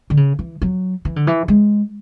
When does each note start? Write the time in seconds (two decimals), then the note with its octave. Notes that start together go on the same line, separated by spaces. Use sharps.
0.10 D3
0.17 C#3
0.39 E3
0.62 F#3
1.05 E3
1.16 D3
1.27 E3
1.48 G#3